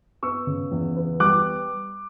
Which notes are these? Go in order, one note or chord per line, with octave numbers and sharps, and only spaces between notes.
B3 C#6 E6
C#3
E2
B3
G3 D6 F#6